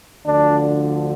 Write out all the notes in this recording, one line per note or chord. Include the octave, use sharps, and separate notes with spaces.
D2 D3 F3 D4